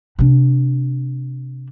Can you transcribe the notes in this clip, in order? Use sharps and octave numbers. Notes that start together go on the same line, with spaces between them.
C3 D4